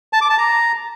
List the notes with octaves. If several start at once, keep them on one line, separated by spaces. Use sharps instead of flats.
A5
D6
A5
A#5